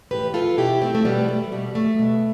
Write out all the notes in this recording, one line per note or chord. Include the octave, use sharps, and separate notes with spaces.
A2 E3 G4 B4
F4 A4
B2 E4 G4
A3 C4
A3
B2 G3 B3
A3
B2 G3
A3
B2